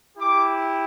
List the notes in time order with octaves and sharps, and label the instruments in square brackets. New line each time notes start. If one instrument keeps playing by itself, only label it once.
[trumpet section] E4 G4 D6